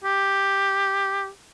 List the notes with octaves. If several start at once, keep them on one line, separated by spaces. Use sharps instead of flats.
G4